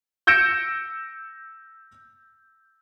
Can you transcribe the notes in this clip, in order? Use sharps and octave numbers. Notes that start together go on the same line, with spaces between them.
E6 G6 A#6 C#7 D7 E7